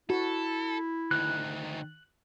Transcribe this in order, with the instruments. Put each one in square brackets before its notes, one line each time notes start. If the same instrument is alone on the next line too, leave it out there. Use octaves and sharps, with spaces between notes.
[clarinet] E4 [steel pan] F#4 [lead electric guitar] A4
[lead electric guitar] D2 D#3 [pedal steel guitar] F#6